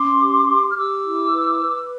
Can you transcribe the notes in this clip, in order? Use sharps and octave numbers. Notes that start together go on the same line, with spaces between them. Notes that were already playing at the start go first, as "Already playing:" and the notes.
Already playing: C#4 C6 D6
G4
G4
F6
G4 D6 E6
E4
B4
B4